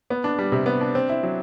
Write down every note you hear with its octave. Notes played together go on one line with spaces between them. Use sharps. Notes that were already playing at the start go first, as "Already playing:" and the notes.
B3
D4
G3
C3
B3
D4
C4
E4
F#3